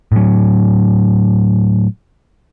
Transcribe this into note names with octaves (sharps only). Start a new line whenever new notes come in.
A2 F#3